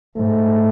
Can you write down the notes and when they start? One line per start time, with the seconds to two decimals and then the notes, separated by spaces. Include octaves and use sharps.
0.16 G#2 A3